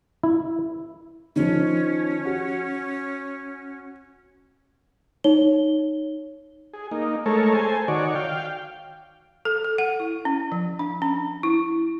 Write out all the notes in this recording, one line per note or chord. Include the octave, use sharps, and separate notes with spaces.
E4
D#3 F3 C#4
F#4
D#4 C#5 G7
G#4
A#3 D#4
G#3 A3 A4 A#4 C#5
A4 C5 G#5
D#3 F#4 C#5 D5
F5 G5
A4
A4
F#5
E4
C#4
F3
D4
C#4
E4